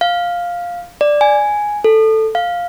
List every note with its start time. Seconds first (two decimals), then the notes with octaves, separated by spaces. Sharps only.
0.01 F5
1.01 D5
1.21 G#5
1.84 A4
2.35 F5